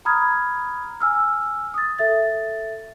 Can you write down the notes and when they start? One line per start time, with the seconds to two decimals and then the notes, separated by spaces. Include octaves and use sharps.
0.05 A#5 B5 D#6 F6 G#6
1.00 G#5 E6 F6
1.74 D#6 A6
1.99 A4 E5 A6